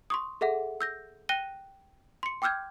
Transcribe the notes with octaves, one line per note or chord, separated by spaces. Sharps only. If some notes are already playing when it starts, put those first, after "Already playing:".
C6 C#6 D#6
G#4 A4 E5 F#5
E6 G6 A#6
G5 F#6 A#6 D#7 G7
C6 C#7
G5 D6 E6 F6 G6 G#6